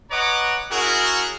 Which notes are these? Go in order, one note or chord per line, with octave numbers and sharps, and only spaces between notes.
B4 C#5 D#5 F#5 A#5 D6
C#4 E4 F#4 G#4 A#4